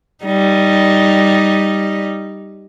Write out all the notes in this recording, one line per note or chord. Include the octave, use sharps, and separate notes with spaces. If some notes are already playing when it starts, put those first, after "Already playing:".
G3 D#4